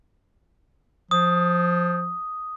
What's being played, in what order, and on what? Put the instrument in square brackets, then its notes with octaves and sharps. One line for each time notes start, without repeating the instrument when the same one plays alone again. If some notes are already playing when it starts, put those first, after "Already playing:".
[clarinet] F3 [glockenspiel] D#6